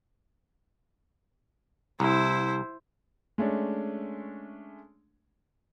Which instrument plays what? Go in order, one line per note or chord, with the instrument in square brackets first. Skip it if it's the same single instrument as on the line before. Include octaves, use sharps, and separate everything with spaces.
[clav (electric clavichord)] C2 [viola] E4 C5
[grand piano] G#3 A3 C#4 D4